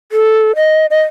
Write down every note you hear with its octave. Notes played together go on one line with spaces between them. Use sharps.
A4
D#5
D#5